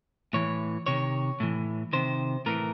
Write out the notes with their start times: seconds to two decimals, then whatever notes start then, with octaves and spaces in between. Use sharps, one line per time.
0.33 A2 E3 C#5
0.86 C3 D#3 C#5
1.40 A2 E3
1.93 C3 D#3 C5
2.46 A2 E3 A#4